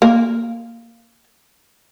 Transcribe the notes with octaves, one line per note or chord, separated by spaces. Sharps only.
A#3